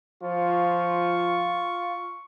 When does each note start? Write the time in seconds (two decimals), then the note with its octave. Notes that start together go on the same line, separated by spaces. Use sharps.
0.23 F3 F4 C#6